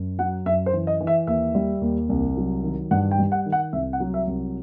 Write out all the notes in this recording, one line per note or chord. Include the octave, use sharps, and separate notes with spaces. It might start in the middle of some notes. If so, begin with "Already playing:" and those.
Already playing: F#2
F#3 F#5
F#2 E5
C5
E3
D#5
E3
E5
D#2 E5
G3
D#2
C2
F#3
D#3
G2 F#5
G5
G3
F#5
D#3
F#5
C2 E5
F#5
F#3
E5
C2